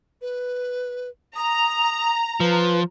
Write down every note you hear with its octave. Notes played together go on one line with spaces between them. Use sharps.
B4
A#5 D#6
F3 B4